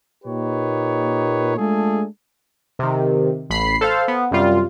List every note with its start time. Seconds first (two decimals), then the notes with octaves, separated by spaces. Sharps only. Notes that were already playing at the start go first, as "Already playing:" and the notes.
0.24 A#2 A#3 D#4 G4 B4 C#5
1.56 G#3 A3 D4 F4 G#4 A4
2.79 C3 D#3
3.50 A1 B5 C7
3.81 A4 C5 F5
4.08 B3
4.31 F#2 C3 G3 F4